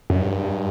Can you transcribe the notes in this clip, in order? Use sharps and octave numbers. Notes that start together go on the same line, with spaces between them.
F#2
G2